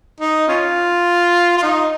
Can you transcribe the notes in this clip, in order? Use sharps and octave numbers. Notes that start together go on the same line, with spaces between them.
D#4
C#4 F4
F4
D#4